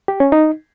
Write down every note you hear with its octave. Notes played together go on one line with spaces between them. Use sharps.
G4
C#4
D#4